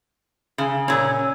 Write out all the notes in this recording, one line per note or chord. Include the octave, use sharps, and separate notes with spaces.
C#3
A#2 C#4